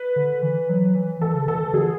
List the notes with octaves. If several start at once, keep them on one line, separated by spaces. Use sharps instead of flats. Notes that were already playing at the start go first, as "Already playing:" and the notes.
Already playing: B4
D3
E3
F#3
E3
E3 A4
C#3
E3 A4
E3
D3 G#4